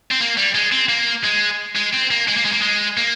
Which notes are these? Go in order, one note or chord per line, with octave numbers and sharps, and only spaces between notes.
C4
A#3
G3
G#3
C4
A#3
G#3
G#3
C4
A#3
G#3
A#3
G#3
A#3
G#3
A#3